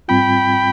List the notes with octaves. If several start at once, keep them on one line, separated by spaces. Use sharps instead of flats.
G#2 G3 C4 F4 G5 B5